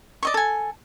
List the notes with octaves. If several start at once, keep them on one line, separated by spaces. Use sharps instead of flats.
D5 D#5 C#6
A4 G#5